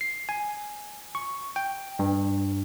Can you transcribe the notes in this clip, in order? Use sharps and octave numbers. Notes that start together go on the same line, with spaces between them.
C7
G#5
C#6
G5
G2